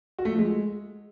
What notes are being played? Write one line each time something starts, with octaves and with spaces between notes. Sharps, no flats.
F#4
A3
F3
G#3